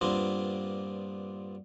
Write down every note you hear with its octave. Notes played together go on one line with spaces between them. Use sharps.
G2 A#2 B3 C4 D4 F4